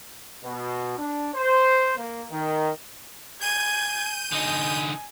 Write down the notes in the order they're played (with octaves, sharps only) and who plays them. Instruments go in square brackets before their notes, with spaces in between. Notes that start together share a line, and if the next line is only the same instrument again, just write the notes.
[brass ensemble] B2
D4
C5
A#3
D#3
[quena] G#5 [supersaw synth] G6 D#7 [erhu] G#6
[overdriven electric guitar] D3 D#4 [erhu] G#5 [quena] D#6